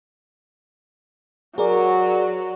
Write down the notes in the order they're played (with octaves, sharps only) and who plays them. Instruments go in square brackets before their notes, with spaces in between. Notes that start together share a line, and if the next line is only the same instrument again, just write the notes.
[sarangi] F#3 [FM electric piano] G#4 A#4 D5